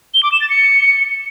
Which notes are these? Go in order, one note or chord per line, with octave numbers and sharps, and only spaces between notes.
G7
D6
E7
A6
C#7